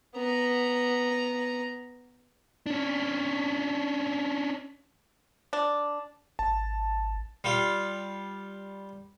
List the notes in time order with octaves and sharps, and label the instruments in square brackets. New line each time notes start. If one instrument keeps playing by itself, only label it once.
[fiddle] B3 A#5
[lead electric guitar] C#4 D4
[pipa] D4
[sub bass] G#1 [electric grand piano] A5
[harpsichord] G3 F4